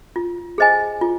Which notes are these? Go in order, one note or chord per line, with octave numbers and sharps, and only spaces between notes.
F4
G#4 C5 D#5 G#5
F4